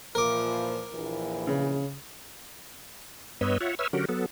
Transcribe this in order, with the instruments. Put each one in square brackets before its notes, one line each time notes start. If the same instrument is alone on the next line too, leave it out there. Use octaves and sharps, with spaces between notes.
[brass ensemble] A#2 E3 F3 [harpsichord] A#4 D6
[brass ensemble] A#1 D#2 E3
[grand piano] C#3
[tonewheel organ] G2 B3 B4 C#5 D#5 E6
F4 C#5 E5 F#5
B4 C#5 E5 E6 F6
D3 F#3 C#4 F#4 G4 A#4
F#3 B3 A4